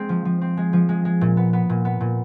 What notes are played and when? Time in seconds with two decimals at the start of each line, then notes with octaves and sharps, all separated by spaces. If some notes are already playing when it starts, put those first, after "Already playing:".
Already playing: G#3 C4
0.09 F3
0.25 F3
0.41 C4
0.57 G#3
0.73 F3
0.89 G#3
1.05 G#3
1.21 A#2
1.37 B3
1.53 B3
1.69 A#2
1.85 B3
2.01 A#2